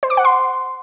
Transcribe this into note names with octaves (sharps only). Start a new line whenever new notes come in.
C5
D6
F#5
C6